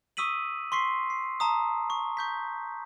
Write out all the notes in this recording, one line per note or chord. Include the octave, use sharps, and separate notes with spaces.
C#6 D#6 E6 B6 D#7 F#7
C6 C#6 B6 C7
C7
A5 A#5 D#6
C#6
C#6 G6 B6